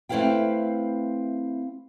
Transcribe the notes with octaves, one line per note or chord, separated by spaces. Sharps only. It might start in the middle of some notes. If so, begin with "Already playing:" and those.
A3 C4 E4 B4 F5 G5